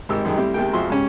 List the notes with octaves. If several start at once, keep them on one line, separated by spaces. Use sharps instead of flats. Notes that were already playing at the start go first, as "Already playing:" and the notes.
G#1 G#2 D#4 G4 A#4 E6
F#2 D#3 G3 G#3 D#4
G3 A3 C4 E4 G4
D#2 C3 D#3 G#3 A#3 G5
F2 F3 F#4 G#4 E5 C6
G#2 C#3 C#4 G4